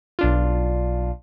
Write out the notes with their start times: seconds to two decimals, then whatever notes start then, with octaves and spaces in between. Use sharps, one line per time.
0.19 B1 D4 F4